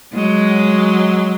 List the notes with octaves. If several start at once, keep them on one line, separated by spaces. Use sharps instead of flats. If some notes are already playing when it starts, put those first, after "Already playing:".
F#3 G#3